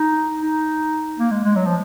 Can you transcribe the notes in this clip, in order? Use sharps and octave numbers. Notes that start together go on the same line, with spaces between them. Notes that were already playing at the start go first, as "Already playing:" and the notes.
Already playing: D#4
D#4
A#3
G#3
G#3
F#3
F3